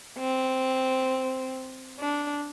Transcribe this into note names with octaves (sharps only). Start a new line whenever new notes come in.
C4
D4